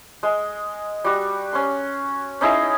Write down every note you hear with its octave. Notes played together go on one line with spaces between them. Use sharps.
G#3
G3 F#4
C#4 C6
C#4 D#4 E4 G#4